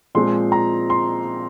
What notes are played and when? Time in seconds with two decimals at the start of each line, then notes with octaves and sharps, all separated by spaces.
0.15 A#2 F3 G#3 C4 C6
0.52 A#5
0.90 C6